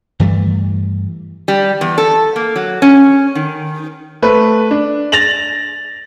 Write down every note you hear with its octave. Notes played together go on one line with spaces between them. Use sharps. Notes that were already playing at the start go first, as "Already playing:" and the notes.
G2 E3 G3 A3
G3
E2
A4
A#3
F#3
C#4
D#3
A3 B4
D4
A6 A#6 F7 F#7